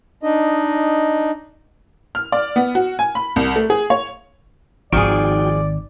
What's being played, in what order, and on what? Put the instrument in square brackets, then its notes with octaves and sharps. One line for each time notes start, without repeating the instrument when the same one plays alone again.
[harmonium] D4 D#4 D#5
[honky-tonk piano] F6
D5
B3
F#4
G#5
B5
C2
A3
G#4
C#5
[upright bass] G#1 D#3 [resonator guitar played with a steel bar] F3 G#4 [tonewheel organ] D#4 F#4 G5 [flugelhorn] D5